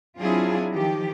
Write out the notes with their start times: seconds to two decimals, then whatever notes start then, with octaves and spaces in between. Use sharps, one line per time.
0.20 F#3 C4 D4 E4 F4 G#4
0.71 D#3 F3 G4